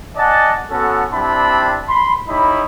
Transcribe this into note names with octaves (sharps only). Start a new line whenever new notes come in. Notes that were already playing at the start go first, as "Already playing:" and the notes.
D5 D#5 F#5 G#5 A5
B3 C#4 F#4 A4
G3 C4 D4 E4 A5 B5
B5 C6
D#4 E4 G4 C#5 B5